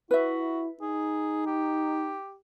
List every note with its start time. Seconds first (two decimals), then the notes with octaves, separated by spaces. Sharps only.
0.11 E4 F#4 B4 E5
0.81 D#4 G#4
1.46 G4